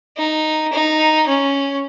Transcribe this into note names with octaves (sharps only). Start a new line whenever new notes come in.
D#4
D#4
C#4